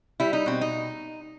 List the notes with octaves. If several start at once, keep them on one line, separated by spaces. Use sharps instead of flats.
G3 E4
D#4
B2 C4
D#4